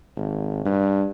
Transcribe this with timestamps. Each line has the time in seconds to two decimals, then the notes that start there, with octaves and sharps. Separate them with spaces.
0.17 G#1
0.65 G2